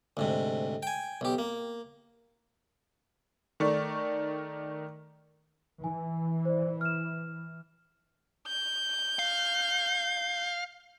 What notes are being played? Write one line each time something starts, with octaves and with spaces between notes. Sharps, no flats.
D2 G#2 C3
G5 G#5
B1 G4
A#3
D#3 A3 D5 C#6
E3 G#5
C5 D5
F6 E7
G6
F5